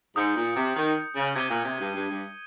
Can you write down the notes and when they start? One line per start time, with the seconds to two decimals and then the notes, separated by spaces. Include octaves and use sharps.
0.16 G#2 D#6 G6 C#7
0.36 A#2
0.56 C3
0.76 D#3
1.16 C#3
1.36 C3 G#6 D#7 G7
1.50 A#2
1.65 C3
1.80 G2
1.95 G2
2.10 G2